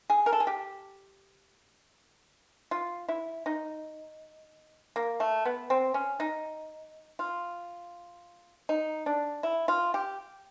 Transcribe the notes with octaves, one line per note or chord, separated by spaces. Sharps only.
G#4
A#4
A4
G#4
G4
F4
E4
D#4
A#3
A3
B3
C4
C#4
D#4
F4
D#4
D4
E4
F4
G4